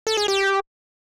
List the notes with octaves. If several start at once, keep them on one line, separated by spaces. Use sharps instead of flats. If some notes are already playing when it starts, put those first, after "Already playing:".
A4
G#4
G4